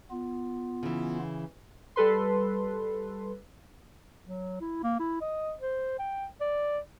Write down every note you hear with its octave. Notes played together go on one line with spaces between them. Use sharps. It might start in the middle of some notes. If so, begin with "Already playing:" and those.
B3 F4
C#3 E3
G3 A4 B4 C6
F#3
E4
A#3
E4
D#5
C5
G5
D5